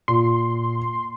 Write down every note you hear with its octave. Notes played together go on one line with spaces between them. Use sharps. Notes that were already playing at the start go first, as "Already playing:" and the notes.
A#2 C6